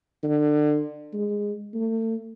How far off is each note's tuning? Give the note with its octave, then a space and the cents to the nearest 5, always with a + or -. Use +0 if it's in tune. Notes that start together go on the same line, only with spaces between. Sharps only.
D3 +25
G#3 -10
A3 +35